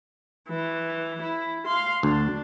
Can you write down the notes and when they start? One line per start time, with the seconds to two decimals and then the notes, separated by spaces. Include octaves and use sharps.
0.49 E3
1.23 E4
1.66 F5 C6
2.03 D2 D4